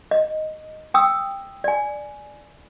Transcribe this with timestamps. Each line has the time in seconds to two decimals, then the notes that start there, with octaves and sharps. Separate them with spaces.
0.11 D#5
0.94 G5 D#6 E6
1.64 D5 G#5